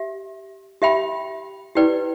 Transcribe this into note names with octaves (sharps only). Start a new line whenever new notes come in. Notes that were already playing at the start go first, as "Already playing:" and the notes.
Already playing: G4 E5
G4 E5 G5 B5
E4 G4 B4 D5 G5